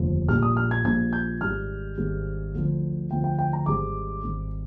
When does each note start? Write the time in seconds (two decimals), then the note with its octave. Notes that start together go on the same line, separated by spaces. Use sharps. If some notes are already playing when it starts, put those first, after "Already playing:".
Already playing: F1 D#2 D3 F3
0.28 A#1 A#2 G3 F6
0.42 D#6
0.57 F6
0.71 G#6
0.84 A#1 A#2 G3 G#6
1.13 G6
1.41 G#1 G#2 D#3 G3 F6
1.98 G#1 G#2 D#3 G3
2.54 D2 D3 F3
3.11 D2 D3 F3 G5
3.24 G5
3.39 G5
3.53 A#5
3.66 G#1 G#2 G3 D6
4.24 G#1 G#2 G3